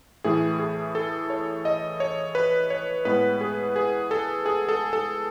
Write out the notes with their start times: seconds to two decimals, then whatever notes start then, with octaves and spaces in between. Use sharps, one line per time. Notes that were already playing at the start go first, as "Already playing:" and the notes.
0.24 A2 E3 A3 G#4
0.59 G#4
0.95 A4
1.30 C#5
1.65 D#5
2.00 C#5
2.35 B4
2.70 C#5
3.05 A2 G#3 B3 B4
3.41 G#4
3.76 G#4
4.11 A4
4.46 G#4
4.69 A4
4.93 A4